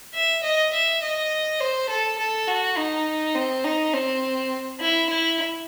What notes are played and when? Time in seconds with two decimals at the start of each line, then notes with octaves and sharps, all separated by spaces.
0.14 E5
0.43 D#5
0.73 E5
1.03 D#5
1.60 C5
1.89 A4
2.18 A4
2.48 F#4
2.77 D#4
3.35 C4
3.64 D#4
3.94 C4
4.80 E4
5.10 E4